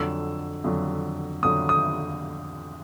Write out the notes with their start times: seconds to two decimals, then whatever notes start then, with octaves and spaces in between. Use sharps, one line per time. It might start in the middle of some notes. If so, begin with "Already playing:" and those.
Already playing: F2 D3 F#3 E6
0.64 F2 D3 F#3
1.43 F2 D3 F#3 D#6
1.69 D#6